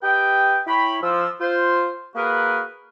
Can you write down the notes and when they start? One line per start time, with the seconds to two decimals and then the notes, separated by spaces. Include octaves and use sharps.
0.03 G4 B4 D#5 G5
0.67 E4 C#5 G5 B5
1.02 F3 E6
1.40 F4 C5
2.16 A#3 F#4 G#4 A#4 B4